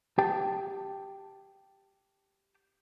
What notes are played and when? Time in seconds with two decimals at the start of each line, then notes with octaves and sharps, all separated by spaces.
0.18 G4 G5 A5